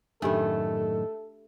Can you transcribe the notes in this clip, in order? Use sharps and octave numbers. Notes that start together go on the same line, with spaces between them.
F#2 A2 D#3 A3 D4 G4 A4 B5